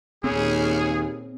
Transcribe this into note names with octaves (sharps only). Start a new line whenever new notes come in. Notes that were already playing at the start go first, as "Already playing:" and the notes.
D#2 A#2 C#3 C4 G#4